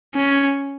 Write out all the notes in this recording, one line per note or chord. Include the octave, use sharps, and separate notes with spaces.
C#4